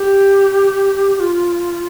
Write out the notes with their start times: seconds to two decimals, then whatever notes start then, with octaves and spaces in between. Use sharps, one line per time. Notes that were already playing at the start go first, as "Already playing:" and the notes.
Already playing: G4
1.20 F4